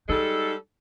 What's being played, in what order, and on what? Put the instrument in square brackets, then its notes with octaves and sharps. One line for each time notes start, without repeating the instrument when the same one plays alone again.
[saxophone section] G3 G#3 A4 [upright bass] D#4